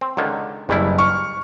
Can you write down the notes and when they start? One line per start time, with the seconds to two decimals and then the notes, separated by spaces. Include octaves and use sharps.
0.01 C4
0.17 C#2 D3 D#3
0.69 F#1 G2 G3 E4
0.98 C#6 F6